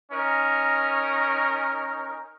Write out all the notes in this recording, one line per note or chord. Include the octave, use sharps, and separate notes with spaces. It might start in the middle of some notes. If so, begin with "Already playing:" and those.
C#4 D#4 A#4